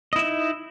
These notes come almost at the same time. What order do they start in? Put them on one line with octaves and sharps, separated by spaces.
D#5 E4 E5 D#4